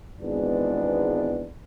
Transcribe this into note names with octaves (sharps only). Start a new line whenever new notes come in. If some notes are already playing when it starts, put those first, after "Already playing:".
G#1 E2 G#3 B3 D4